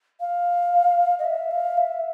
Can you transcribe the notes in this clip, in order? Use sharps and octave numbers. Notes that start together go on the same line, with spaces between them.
F5
D#5
E5
F5
E5